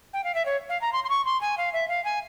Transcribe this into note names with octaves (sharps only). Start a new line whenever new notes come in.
G5
F5
E5
C#5
F5
A#5
C6
C6
C#6
C6
G#5
F5
E5
F5
G#5